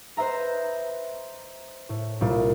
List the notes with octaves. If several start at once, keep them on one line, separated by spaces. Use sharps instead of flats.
B4 C5 D#5 E5 A#5
A2
C2 A#2